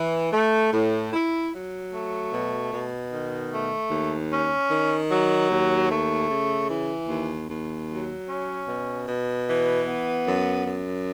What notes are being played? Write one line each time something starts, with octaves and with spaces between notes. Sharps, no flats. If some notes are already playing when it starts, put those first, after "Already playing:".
Already playing: E3
A3
A2
E4
F#3
A3
B2
B2
D#3
A3
D#2
C#4
D#3
F#3
D#2
A3
C#3
E3
D#2
D#2
F#3
C#4
B2
B2
E3
B3
F#2
F#2